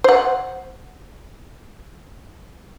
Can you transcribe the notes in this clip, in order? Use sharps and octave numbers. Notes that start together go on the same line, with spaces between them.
C5 F#5